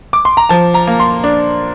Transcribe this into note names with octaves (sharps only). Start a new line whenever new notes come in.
D6
C6
A#5
F3 A5
A#5
A#3
C6
D4